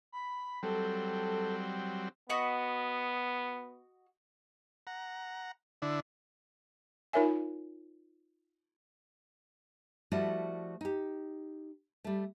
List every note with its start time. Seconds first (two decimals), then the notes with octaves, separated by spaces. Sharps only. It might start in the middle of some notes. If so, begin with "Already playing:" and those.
0.12 B5
0.63 F#3 G3 C4 A4
2.29 B3 F#4 D#5 B5
4.87 F#5 A#5
5.82 D3 D4 E4
7.13 D#4 F4 A#4 C#5 E5 G#5
10.12 F3 G3 A3 E4 F#4 D5
10.81 D#4 G4
12.04 G3 A3